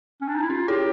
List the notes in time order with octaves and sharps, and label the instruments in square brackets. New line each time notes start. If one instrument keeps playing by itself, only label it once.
[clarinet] C#4
D4
D#4
E4
[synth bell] C#4 [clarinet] F4
[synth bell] E4 G#4 C#5 [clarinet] G4